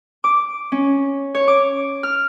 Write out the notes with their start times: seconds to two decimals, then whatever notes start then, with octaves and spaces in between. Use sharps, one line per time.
0.24 D6
0.72 C#4
1.35 C#5
1.48 D6
2.03 F6